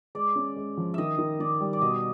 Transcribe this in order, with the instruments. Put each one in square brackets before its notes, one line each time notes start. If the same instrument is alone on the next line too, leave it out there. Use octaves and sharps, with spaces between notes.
[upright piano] G#3 [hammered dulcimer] D5
[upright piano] C#4
G#3
F3
[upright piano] D#3 [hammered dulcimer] D#5 E5
[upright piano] D#3
[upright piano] D#3 [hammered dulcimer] D5
[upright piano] G3
[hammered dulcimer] D5
[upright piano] B2 [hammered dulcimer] D#5